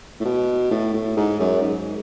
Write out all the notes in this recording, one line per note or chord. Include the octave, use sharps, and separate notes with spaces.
A2
B2
A2
A2
G#2
F#2
G#2